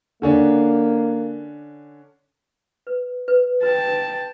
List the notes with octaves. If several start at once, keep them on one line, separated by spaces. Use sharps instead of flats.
D3 A#3 C#4 D4
B4
B4
F#4 B4 G5 A5